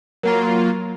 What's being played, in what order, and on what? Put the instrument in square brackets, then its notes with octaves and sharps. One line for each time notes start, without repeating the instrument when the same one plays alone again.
[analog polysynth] F#3 A#3 F4 [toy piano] A#4 F#5 A#5